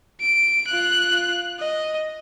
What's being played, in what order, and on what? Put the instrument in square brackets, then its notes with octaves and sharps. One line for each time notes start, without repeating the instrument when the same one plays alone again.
[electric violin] D7
F4 F#6
D#5